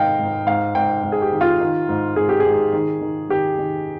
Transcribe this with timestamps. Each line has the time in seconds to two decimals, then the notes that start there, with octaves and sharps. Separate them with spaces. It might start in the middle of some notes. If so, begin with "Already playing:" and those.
Already playing: G#2 D#3 D#5 F5 G5
0.19 G#2
0.46 G#2 F5
0.75 G#2 G5
1.03 G#2
1.12 G#4
1.22 G4
1.32 D#3
1.41 F4
1.60 D#3
1.89 G#2
2.16 G#2 G#4
2.29 G4
2.40 G#4
2.45 G#2
2.73 D#3
3.01 D#3
3.29 D#3 G4
3.58 D#3